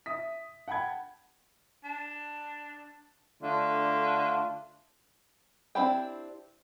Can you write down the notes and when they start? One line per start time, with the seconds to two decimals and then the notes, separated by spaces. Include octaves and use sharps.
0.06 E5 D#6 B6
0.68 F#5 G5 A5 B5 G#6
1.84 D4
3.42 D3 A3 D4 F4
5.75 C4 D4 E4 G4 G5